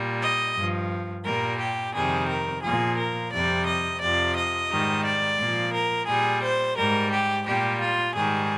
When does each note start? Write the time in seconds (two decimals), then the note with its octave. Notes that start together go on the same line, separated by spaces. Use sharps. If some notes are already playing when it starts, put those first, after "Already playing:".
Already playing: A#2 G3
0.21 D#5
0.55 G2 F3
1.24 A#2 G3 A#4
1.59 G4
1.93 F2 C3 D#3 G3 G#4
2.28 A#4
2.63 A#2 F3 G#4
2.98 A#4
3.31 F2 C3 G3 D5
3.67 D#5
4.01 F2 C3 F3 D5
4.35 D#5
4.70 G#2 D#3 G3
5.04 D5
5.39 A#2 F3
5.73 A#4
6.07 A#2 G3 G#4
6.43 C5
6.77 G#2 G3 A#4
7.11 G4
7.46 A#2 G3 G4
7.80 F4
8.14 G#2 D#3 G3 G#4